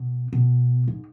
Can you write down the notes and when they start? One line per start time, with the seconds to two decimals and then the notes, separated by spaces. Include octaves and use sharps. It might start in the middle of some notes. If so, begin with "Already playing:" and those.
Already playing: B2
0.33 B2
0.88 G#2